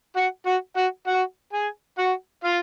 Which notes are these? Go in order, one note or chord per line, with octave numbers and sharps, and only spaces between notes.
F#4 F#5
F#4 F#5
F#4 F#5
F#4 F#5
G#4 G#5
F#4 F#5
F4 F5